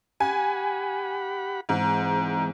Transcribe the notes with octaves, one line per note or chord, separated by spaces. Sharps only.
G4 F#5 G#5 B5
G#2 E3 G#3 C4